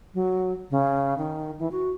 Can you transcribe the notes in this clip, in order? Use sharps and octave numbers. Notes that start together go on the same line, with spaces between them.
F#3
C#3
D#3
E3
F#4